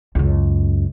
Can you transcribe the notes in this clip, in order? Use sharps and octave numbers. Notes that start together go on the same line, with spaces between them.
C#2 F#2